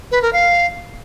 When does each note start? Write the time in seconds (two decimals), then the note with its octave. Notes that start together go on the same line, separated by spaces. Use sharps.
0.11 B4
0.22 A#4
0.33 F5